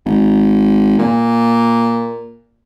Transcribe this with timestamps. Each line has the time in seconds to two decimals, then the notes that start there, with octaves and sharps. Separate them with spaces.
0.06 G#1
0.99 A#2